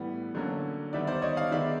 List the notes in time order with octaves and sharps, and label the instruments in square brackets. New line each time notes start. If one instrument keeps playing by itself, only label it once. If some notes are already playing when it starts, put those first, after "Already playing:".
Already playing: [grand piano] A2 E3 G3 B3
D3 F#3 A#3 C#4
D#3 G3 B3 D5 E5
C5 D5
C#5 D#5
D#5 F5
D#3 G#3 B3 D5 E5